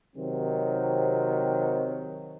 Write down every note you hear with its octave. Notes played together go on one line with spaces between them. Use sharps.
C3 D#3 F#3 C4